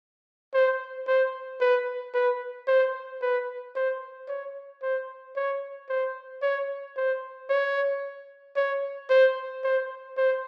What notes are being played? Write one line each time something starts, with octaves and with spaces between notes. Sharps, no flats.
C5
C5
B4
B4
C5
B4
C5
C#5
C5
C#5
C5
C#5
C5
C#5
C#5
C5
C5
C5